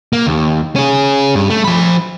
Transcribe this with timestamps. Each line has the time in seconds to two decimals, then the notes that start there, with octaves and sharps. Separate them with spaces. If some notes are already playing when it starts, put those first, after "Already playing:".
0.13 A#3
0.27 D#2
0.76 C#4 G#4
1.35 G2
1.50 A3
1.64 F3 B5